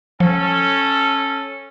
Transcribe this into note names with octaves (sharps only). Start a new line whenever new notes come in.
F3 C#4 A4